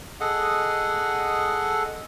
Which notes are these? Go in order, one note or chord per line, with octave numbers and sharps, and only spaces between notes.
G#4 A4 D#5 F#5